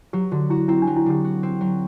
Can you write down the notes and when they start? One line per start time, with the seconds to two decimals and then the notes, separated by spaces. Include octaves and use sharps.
0.13 F#3 G4
0.31 D3 F#4
0.50 E4 F#4
0.68 C4 E4
0.82 D4
0.87 F#3
0.96 E4
1.06 D3 G4
1.24 F#4
1.43 C4
1.61 F#3